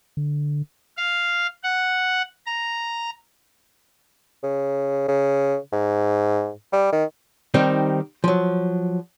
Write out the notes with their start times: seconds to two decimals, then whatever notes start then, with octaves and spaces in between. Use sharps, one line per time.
0.17 D3
0.97 F5
1.64 F#5
2.46 A#5
4.43 C#3
5.08 C#3
5.72 G#2
6.72 G3
6.93 D#3
7.54 D#3 G3 C4 D#4
8.24 F3 F#3